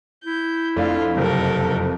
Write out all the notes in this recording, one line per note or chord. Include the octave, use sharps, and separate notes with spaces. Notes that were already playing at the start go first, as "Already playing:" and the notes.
E4 G6
F2 A3 D4 F4 F5
F#1 C3 A4 A#4